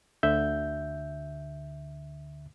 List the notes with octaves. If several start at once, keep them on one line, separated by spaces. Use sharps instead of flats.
D2 D3 E5 G6